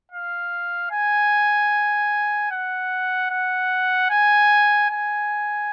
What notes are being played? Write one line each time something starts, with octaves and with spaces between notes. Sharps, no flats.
F5
G#5
F#5
F#5
G#5
G#5